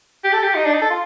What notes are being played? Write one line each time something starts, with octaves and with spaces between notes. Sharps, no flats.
G4
A4
G4
D#4
D4
D#4
A4
F4